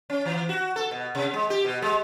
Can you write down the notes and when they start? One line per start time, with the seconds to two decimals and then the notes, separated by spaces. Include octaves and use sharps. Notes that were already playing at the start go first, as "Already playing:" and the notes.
0.10 C#4
0.25 E3
0.49 F#4
0.76 A4
0.91 B2
1.15 C3
1.34 G#3
1.50 G4
1.65 B2
1.82 G#3